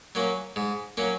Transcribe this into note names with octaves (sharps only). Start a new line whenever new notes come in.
F#3 A#3 C#4
G#2
F#3 A#3 C#4